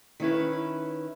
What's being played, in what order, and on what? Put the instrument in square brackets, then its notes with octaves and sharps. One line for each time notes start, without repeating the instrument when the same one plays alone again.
[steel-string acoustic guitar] D#3 C#4 E4 B4